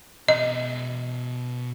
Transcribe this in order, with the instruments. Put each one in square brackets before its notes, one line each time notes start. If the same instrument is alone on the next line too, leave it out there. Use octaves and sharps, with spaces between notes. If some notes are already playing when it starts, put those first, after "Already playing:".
[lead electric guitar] B2 E5 [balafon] D#5